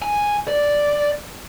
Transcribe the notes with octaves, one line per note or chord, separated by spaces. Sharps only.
G#5
D5